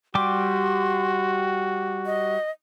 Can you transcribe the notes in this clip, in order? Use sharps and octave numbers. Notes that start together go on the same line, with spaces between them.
G3 F#4 G4 C6 D6
D#5